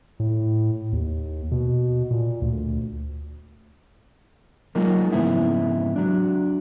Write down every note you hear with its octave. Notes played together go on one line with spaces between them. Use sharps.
A2
D#2
B2
A#2
D2
F#3 G#3 A#3 D#4 F4 A#4
F2 G#2 C#3 E3 B3 E4
F#3 D4